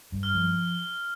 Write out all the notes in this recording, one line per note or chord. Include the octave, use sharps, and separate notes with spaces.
G2
F6
F3